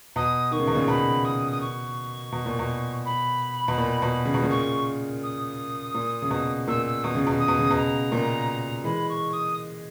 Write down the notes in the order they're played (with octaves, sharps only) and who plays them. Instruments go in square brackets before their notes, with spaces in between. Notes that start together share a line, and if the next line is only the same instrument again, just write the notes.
[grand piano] B2 [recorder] D#6
[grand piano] D#3 [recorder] C#6
[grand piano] C#3
B2
A#2 C#3
[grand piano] B2 [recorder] B5
[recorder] D#6
D#6
C#6
[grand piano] B2
A#2
B2
[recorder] B5
[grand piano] B2
A#2
B2
C#3
B2
A#2 C#3
[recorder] C#6
D#6
[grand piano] A#2
C#3
B2
[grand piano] A#2 [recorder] E6
[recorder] E6
[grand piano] B2 [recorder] D#6
[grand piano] C#3
B2
[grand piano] C#3 [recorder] D#6
[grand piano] B2
C#3
B2
[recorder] A#5
[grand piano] A#2 C#3
[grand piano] E3 G#3 [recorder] B5
[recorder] C#6
D#6